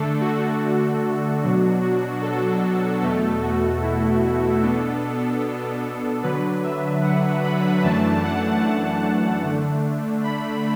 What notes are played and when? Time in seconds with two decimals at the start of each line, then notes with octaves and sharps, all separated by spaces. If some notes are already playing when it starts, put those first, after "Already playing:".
Already playing: D3 A3 D4 A4
0.21 F#4
1.41 B2 F#3 D4 F#4
1.81 F#4
2.22 A4
3.01 E2 B2 A3 A4
3.42 F#4
3.82 E4
4.23 F#4
4.62 B2 B3 D4 A4
6.23 D3 F#3 D4 B4
6.64 E5
7.03 F#5
7.43 B5
7.84 F#2 E3 A3 D4 A5
8.23 F#5
8.64 A5
9.43 D3 A3 D4
10.23 B5